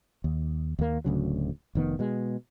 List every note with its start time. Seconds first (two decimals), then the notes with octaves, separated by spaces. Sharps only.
0.24 D#2
0.79 D#2 A#3
1.05 D1 D2 C#3 F#3
1.75 F1 D#3 B3
1.99 B2 G#3